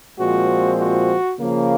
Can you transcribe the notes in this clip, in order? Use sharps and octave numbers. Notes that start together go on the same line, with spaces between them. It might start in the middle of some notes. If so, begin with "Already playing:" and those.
A#2 F3 G#3 C4 F#4
F#4
C#3 F3 A#3